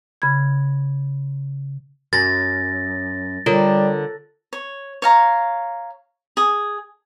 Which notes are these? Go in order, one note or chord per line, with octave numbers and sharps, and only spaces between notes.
C#3 B5 G#6
F#2 A6 A#6
D3 G3 F4 A#4 C#5
C#5
C#5 F5 A#5
G#4